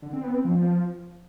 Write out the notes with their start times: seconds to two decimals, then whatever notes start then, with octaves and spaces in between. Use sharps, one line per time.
0.02 D3
0.13 C4
0.24 B3
0.34 C4
0.45 F3